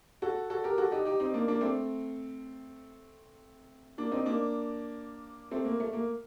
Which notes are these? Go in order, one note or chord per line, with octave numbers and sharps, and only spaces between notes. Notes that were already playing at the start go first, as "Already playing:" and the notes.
F#4 A4
F#4 A4
G4 A#4
F#4 A4
D#4 G4
D#4 G4
C4 D#4
A#3 D4
A#3 D4
A3 C4
A#3 D4
C4 D#4
A#3 D4
A3 C4
A#3
A3
A#3